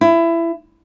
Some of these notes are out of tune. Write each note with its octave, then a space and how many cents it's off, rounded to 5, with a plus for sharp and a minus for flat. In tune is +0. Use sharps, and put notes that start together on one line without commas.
E4 +20